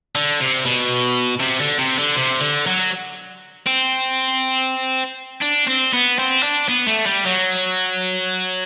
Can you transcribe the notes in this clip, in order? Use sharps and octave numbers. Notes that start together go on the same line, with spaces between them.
D3
C3
B2
C3
D3
C3
D3
C3
D3
F#3
C4
D4
C4
B3
C4
D4
B3
A3
G3
F#3